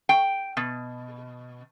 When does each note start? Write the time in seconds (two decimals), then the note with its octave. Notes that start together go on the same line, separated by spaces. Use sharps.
0.09 G5
0.57 B2